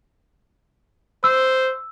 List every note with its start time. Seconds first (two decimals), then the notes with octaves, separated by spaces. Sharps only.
1.24 C5 E6